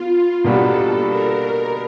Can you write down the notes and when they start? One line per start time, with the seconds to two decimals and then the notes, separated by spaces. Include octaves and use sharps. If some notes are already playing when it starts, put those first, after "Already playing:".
Already playing: B3 F4
0.44 B2 G3 A#3 D4 F#4 A4
1.10 A#4